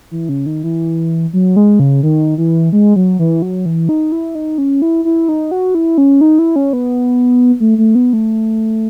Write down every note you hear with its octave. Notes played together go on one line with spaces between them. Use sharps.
E3
C#3
D#3
E3
F#3
G#3
C#3
D#3
E3
G#3
F#3
E3
F#3
E3
D#4
E4
D#4
C#4
E4
E4
D#4
F#4
E4
C#4
D#4
E4
C#4
B3
A3
A3
B3
A3